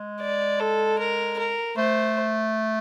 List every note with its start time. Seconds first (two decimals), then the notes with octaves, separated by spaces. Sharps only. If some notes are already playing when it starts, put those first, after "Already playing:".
Already playing: G#3
0.21 D5
0.60 A4
0.99 A#4
1.39 A#4
1.77 A3 C5